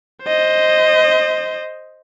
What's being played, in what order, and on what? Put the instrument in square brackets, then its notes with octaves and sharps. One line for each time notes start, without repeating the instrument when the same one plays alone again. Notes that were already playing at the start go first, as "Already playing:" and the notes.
[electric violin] C5 D#5